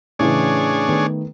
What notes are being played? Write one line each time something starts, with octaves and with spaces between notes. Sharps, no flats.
A2 C#3 E3 D4 G#4 C#5
D#3 A3 B3